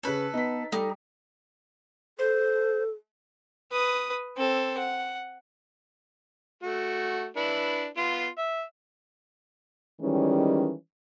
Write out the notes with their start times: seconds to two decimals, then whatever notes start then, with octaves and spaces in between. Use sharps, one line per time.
0.03 C#3 C#4 A4 B4
0.33 B3 D#4 B6
0.72 G3 D#4 G4 A4
2.19 A4 C5
3.71 B4 D#6
4.37 C4 A4
4.78 F#5
6.63 A3 F#4
7.37 D4 E4 B4
7.97 B3 F4 C6
8.38 E5
10.01 D#3 E3 G3 G#3 C#4